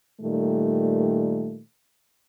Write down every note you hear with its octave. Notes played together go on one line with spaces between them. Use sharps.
A#2 D#3 G3 A3